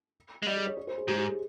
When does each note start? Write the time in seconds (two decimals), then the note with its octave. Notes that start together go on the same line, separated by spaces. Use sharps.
0.43 G#3
0.47 G3 D#5
0.56 G#4
0.67 C#5
0.77 C#5
0.87 C5
0.98 G#4
1.08 G#2 G4
1.18 G4
1.28 G#4